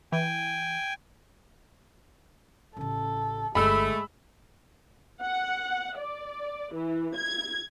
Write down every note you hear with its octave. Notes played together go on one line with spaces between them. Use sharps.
E3 G5 G#5
A1 C#3 A4
G1 G#3 A3 B5 E6
F#5
D5
E3
G#6